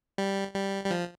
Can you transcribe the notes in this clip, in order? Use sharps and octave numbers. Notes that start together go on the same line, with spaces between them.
G3
G3
G3
F3